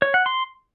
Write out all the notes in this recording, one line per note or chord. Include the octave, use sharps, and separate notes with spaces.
C#5
F#5
C6